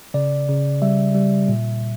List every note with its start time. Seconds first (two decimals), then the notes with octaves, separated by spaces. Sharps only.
0.14 C#3 D5
0.49 C#3
0.82 G3 E5
1.14 G3
1.48 A#2